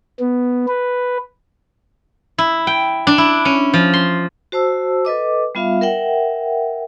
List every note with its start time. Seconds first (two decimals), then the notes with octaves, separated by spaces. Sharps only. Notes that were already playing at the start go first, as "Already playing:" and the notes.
0.20 B3
0.68 B4
2.38 E4
2.67 G5
3.07 D4
3.18 E4
3.45 C#4
3.74 F3
3.94 C6
4.52 F#4 C5 A5 E6
5.05 A4 B4 D#5 D6
5.55 G3 B3 F4 E5 F5
5.81 A#4 E5 F#5 G5